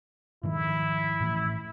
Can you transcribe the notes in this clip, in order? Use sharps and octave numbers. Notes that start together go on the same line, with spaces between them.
G#2 D#3 F3 E4
A2 E3